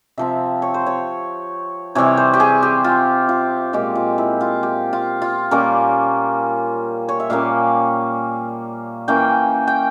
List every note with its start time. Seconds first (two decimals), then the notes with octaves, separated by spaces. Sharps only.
0.17 C3 F3 C4 E5
0.62 C#5
0.74 C5
0.86 C#5
1.95 C3 E3 G3 C4 C#5
2.17 C5
2.34 G4
2.40 G#4
2.62 G4
2.84 F4
3.29 F4
3.73 A#2 G#3 C4 G4
3.95 F4
4.18 E4
4.41 F4
4.63 G4
4.93 F4
5.22 F4
5.51 A#2 G3 A#3 C#4 A#4
7.09 C#5
7.20 E5
7.30 A#2 G3 A#3 C#4 F5
9.08 E3 A#3 C#4 G5
9.67 G5